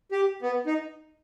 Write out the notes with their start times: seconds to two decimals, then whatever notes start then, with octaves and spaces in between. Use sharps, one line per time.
0.12 G4
0.42 B3
0.67 D#4